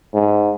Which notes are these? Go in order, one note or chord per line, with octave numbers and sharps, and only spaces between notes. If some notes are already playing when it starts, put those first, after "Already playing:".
G#2